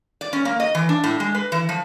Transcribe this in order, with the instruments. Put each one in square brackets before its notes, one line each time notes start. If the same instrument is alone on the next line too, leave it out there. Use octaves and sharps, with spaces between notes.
[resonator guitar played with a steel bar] D5
C#4
A#3
D#5
E3
D4
A2
G#3
B4
E3
F3